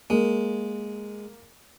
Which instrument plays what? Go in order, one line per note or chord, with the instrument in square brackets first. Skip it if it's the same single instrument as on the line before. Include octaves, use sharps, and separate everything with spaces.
[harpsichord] G#3 [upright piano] A#3